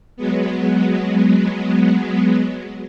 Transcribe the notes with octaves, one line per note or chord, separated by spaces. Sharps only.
F#3 G#3 B3